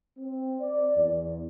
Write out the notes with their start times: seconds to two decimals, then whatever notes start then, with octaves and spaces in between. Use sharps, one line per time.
0.19 C4
0.61 D5
0.97 E2